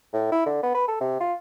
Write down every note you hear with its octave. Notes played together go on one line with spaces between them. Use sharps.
A2
E4
D3
B3
B4
A4
C3
F4